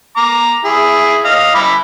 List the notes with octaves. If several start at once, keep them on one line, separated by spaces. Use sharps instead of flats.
A#5 D6
E4 G#4
D#5 F5
E4 B5 D6